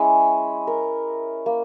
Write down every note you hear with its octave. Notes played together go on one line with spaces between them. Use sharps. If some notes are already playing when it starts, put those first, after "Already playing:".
Already playing: G#3 C#4 E4 G#4
A#4
A#3